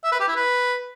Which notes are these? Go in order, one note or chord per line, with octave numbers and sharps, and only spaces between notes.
E5
B4
G4
E4
B4